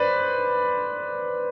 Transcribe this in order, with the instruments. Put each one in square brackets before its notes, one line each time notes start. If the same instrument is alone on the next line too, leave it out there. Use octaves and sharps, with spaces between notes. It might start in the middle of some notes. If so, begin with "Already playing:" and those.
Already playing: [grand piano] B4 C5 D5